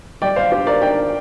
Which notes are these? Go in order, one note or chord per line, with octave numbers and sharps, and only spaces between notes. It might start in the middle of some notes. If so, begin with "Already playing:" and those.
G3 D5 G5
C5 F5
D4 G4 C5
A#4 D5
D4 D5 G5